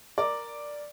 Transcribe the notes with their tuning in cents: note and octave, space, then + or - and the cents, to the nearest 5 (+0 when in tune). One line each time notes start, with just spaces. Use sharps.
A#4 +0 D5 +0